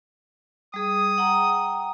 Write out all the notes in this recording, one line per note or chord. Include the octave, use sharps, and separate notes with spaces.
G3 G#4 D#6
F#5 G5 A#5